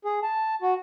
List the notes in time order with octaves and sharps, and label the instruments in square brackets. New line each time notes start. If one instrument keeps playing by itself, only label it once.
[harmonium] G#4
A5
F#4